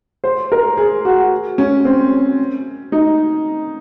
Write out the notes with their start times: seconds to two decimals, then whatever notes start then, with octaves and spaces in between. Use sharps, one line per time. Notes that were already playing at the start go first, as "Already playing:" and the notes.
0.24 C5
0.52 A#4
0.77 G#4
1.05 F#4
1.58 C#4
1.85 C4
2.92 D#4